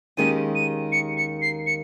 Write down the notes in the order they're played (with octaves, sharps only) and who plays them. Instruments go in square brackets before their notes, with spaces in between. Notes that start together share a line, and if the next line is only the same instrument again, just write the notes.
[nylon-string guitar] D#2 D#3 G#3 C#4 G4 [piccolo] D#7
[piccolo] D#7
C#7
C#7
C7
C#7